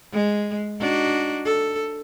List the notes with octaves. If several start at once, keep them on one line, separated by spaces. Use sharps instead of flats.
G#3
D4 D#4 F#4
A4